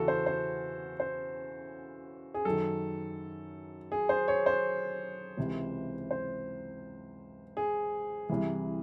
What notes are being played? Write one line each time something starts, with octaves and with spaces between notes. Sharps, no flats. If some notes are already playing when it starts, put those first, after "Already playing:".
Already playing: E2 C#3 E3 F#4 A4
C5
C5
C5
G#4
F#2 D#3 A4
G#4
C5
C#5
C5
C#2 C3 E3
C5
G#4
C2 C3 E3